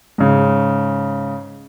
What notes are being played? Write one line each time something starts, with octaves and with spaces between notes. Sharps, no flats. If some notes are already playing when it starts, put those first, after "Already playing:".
G#2 C#3